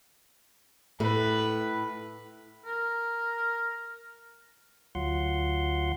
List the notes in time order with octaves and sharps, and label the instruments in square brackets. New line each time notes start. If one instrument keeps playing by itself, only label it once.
[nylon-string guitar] A2 [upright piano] A3 [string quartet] B4
[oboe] A#4
[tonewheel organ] D2 F#3 F4 F#5 C6